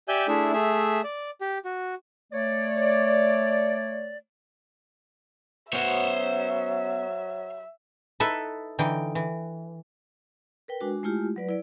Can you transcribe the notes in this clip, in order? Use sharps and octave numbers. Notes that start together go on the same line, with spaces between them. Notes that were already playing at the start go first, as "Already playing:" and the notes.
G4 D5 E5 G#5 G6
A3 D4 E4 G#4 E5
A3 G#4 E5
D5
G4
F#4
A3 C#5 D5
F#3 B3 C#4 F#4 C5 C#5 E5
D#4 E4 A4 B4 E5
D3 E3 D#4 G5
E3
A#4 B4 G5
G#3 D4 F#4
G#3 A3 E4 F4 G4
F#3 B4 D5
E4 D5